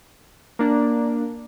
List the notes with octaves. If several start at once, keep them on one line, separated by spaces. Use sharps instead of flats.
A#3 D4